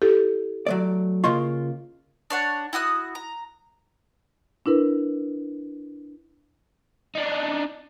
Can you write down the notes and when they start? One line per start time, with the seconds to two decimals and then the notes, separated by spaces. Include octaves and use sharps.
0.02 E4 G4 A4
0.66 F#3 A3 D5
1.24 C#3 A#3 F4 D#5 C6 C#6
2.30 D4 C#5 F#5
2.73 E4 F#4 D#6 F#6
3.15 A#5
4.66 D4 E4 A#4 B4
7.15 D4 D#4